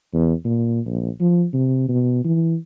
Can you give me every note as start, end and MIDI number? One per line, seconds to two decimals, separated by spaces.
0.14 0.33 40
0.44 0.80 46
0.86 1.10 34
1.20 1.45 53
1.53 1.86 48
1.89 2.23 47
2.24 2.56 52